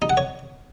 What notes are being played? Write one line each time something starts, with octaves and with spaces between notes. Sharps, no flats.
D#4
F#5
C#5